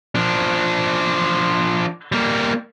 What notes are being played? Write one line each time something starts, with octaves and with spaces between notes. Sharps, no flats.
F3 D4
G3 A#3